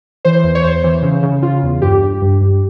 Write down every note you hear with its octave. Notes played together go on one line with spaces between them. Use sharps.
E3 C5
E2
C#5
E2 C5
E3
C#3
C#3
C#3 F4
E2
G2 G4
G2
G2
G2